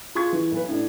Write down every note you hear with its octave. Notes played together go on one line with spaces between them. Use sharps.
F4 G#4 C#6 G#6
E3
B1 B4
A2 D4